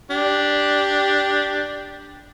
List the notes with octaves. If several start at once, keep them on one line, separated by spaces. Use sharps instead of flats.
D4 G4